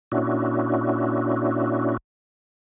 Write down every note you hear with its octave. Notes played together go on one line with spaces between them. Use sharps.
A#2 C#4 D4 E4 F#4